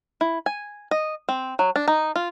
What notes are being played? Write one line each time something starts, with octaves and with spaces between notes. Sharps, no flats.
E4
G#5
D#5
C4
F#3
D4
D#4
F4